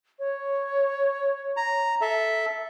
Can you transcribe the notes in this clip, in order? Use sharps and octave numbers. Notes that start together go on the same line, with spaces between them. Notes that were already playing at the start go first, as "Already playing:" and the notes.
C#5
A#5
A4 E5